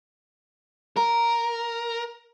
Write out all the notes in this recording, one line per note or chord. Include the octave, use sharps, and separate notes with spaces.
A#4 A#5